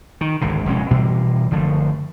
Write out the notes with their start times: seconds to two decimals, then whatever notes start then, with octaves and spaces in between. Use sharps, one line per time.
0.21 D#3
0.41 G#1 C#2 D3
0.66 F1 B2 G#3 C#4
0.91 B2 E3 G3 A#3
1.51 F#1 D3 F3 A3